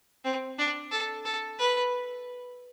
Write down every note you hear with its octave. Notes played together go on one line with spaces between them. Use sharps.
C4
D4
A4
A4
B4